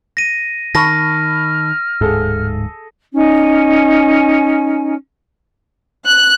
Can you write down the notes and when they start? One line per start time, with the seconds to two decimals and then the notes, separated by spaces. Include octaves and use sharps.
0.17 A#6 D#7
0.75 D#3 A5 B5 C#6 F6 A#6
2.01 D1 G#2 G#4 A4
3.14 C#4 D#4 G#5
6.06 F#6